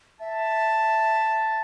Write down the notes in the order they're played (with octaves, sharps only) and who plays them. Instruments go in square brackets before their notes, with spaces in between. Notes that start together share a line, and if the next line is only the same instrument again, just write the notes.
[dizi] E5 [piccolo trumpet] A5